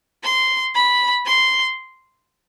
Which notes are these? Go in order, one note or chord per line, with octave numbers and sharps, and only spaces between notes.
C6
B5
C6